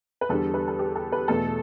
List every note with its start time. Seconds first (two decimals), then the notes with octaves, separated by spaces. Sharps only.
0.21 B4
0.29 E2 D3 G3 A4
0.54 B4
0.68 A4
0.79 G4
0.96 A4
1.12 B4
1.28 E2 B2 A3 A4